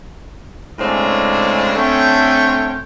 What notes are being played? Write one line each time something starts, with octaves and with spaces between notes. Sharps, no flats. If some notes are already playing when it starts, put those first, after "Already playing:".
A2 C#3 G#3 C4 D4
D3 A3 C4 C#4 C#5 G5